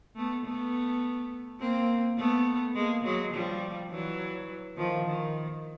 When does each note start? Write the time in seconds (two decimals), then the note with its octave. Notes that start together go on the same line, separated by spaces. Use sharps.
0.16 A3 B3
0.45 A3 B3
1.60 A#3 C4
2.18 A3 B3
2.75 G#3 A#3
3.05 F#3 G#3
3.33 F3 G3
3.90 E3 F#3
4.77 D#3 F3
5.06 D#3